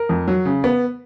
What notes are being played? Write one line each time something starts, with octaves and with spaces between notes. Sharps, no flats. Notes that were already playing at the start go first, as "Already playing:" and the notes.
Already playing: A#4
F2
F#3
C#3
B3